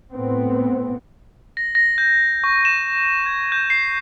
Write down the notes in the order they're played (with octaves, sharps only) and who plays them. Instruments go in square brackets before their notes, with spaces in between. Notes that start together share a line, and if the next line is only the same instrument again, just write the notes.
[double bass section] A2 B3 C4
[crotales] A#6
A#6
G6
C#6
E7
G#6
G6
C7